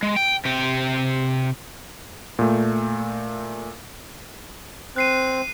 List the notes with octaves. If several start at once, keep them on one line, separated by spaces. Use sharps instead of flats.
G#3
G5
C3 G4
A#2 A3
C4 F#6 C7 D#7